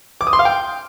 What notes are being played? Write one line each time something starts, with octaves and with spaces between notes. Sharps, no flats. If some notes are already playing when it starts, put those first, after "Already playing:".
D6
D#6
C6
F5
G5